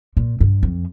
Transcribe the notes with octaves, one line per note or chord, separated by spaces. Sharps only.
A#2
G2
F2